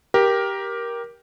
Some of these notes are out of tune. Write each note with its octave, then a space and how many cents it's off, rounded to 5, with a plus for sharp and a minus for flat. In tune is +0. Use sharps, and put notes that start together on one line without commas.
G4 +0 A#4 +15